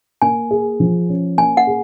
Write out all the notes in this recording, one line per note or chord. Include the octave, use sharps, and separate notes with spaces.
A#3 G#5
G#4
F3
C#4
A#3 G#5
F#5
G#4